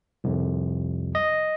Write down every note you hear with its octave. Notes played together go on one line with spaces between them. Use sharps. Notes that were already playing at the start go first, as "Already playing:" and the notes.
C2 F2
D#5